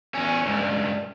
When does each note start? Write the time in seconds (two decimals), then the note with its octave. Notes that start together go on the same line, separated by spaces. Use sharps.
0.14 E2 C#4
0.46 C#2 G2